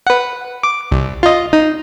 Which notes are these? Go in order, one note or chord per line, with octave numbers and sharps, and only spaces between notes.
B4 F#5
D6
C2
F4 D#5
D#4